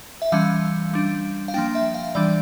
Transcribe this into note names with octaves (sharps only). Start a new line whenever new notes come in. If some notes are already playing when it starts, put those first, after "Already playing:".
E5
E3 G3 C#4 F5
G3 D4
F5
F3 A#3 D4 G5
E5
F5
E3 G3 D4 D5